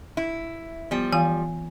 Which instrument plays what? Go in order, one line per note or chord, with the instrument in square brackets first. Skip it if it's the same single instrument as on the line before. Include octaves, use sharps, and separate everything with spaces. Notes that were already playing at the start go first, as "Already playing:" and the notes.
[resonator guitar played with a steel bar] E4
[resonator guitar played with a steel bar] F3 G3 [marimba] B3
[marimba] E3 F4 F5 [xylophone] G#5